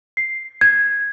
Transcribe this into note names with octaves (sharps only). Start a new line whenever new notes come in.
C7
G#6